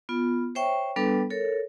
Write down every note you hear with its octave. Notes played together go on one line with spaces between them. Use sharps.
B3 F4
C5 C#5 E5 G5 C#6
G3 B3 D4 A4 B4
A4 A#4 C#5